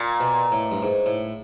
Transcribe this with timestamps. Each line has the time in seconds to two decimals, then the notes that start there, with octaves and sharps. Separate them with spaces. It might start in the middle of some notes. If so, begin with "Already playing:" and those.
Already playing: A#2
0.20 B2
0.52 A2
0.72 G2
0.83 G#2
1.06 A2